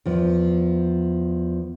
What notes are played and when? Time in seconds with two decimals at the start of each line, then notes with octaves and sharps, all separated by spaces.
0.06 E2 F3